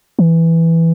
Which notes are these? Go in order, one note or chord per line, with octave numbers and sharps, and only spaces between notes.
E3